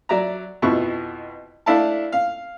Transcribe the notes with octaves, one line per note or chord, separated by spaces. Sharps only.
F#3 D5 E5 A#5
F2 B2 E4 C#6
A3 D4 E4 F5 A5
F5